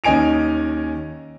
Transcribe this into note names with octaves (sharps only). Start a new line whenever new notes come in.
D#2 C#4 D#5 G#5 D7 F7